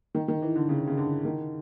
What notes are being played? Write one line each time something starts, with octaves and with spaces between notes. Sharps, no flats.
D#3
D#3
E3
D3
C#3
C#3
D3
D#3